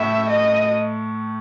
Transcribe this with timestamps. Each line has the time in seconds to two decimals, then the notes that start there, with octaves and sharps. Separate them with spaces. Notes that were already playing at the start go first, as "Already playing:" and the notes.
Already playing: A2 A3 E5
0.30 D#5